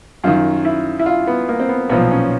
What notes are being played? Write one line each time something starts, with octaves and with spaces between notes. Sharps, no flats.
F#2 D#3 F4
E4
E4
F4
B3
A#3
C4
B3
B1 A#2 F3 B3
C#4